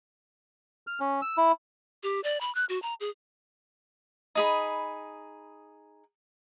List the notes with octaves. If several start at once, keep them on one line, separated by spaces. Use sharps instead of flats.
F6
C#4
E6
E4
G4
D5
B5
F#6
F#4
A#5
G#4
D#4 G#4 B5